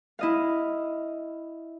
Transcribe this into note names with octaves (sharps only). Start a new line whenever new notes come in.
E4 D#5 F5